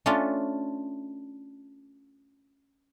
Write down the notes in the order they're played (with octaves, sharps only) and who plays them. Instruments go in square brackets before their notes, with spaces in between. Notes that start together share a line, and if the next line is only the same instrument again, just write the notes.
[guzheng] A3 C#4 D4 F4